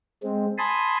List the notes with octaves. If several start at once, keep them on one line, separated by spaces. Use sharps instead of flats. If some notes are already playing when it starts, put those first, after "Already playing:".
G#3 C4
G#5 A5 B5 C6 D#6